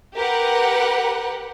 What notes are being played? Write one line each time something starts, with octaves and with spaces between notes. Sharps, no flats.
G4 A#4 B4 F#5